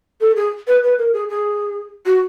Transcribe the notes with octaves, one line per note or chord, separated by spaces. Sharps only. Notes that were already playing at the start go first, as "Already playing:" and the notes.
A4
G#4
B4
B4
A#4
G#4
G#4
F#4